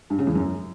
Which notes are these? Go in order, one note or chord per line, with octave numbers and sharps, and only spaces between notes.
G2
C#3
E2
F#2